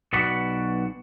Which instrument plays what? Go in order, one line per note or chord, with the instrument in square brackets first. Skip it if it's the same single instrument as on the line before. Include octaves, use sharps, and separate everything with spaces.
[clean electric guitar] B1 B2 F#4 D5 F#5 B5